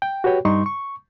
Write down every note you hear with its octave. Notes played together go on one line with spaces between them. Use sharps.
G5
F#4 G4 B4 C#5 G5
G2 G3 D#4 C6 C#6
C#6